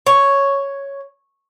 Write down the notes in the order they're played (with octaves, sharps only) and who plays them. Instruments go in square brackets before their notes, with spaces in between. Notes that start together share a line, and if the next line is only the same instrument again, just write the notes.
[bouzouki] C#5